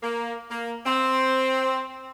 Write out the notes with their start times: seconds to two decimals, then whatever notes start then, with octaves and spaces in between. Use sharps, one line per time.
0.03 A#3
0.50 A#3
0.84 C4